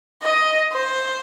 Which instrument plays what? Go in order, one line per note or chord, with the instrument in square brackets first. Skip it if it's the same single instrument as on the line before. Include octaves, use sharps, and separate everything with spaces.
[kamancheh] D#5
C5